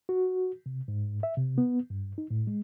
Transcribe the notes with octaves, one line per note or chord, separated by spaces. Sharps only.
F#4
C3
G#2
E5
C3
B3
G2
D#4
A2
G#3